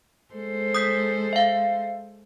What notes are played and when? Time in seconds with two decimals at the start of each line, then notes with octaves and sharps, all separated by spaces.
0.34 G#3 A4 C5
0.75 D#6 G6 B6
1.33 E5 F5